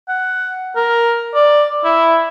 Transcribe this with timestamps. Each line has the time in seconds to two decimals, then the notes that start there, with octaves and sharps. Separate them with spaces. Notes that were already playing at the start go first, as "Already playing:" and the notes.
0.09 F#5
0.76 A#4
1.35 D5
1.84 E4